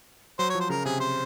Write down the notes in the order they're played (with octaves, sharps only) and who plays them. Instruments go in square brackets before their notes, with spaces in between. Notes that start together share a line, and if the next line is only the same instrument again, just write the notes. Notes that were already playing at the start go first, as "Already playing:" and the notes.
[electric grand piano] F#3 [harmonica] C5
[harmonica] C#5
[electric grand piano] F3
[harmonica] C5
[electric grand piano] C#3 [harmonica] A#4
[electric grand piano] C3 [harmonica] G#4
[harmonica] C5